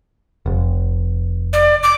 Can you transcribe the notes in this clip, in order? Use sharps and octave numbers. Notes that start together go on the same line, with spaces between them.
F1
D5
D6